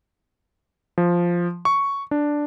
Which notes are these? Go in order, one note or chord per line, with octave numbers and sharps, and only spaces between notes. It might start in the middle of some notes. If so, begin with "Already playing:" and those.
F3
C#6
D4